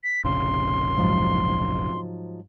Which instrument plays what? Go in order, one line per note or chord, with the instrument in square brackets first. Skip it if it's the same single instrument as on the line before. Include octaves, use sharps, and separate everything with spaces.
[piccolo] B6
[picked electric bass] F1 A#1 C#3 [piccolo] C6
[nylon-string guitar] G#2 F3 F#3